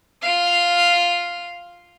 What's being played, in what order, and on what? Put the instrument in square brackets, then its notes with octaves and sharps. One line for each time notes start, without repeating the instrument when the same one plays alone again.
[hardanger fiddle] F4 F5